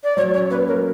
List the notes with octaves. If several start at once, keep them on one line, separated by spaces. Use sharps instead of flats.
D5
F#3 C#5
C#4 C#5
A#3 B4
F#3 A#4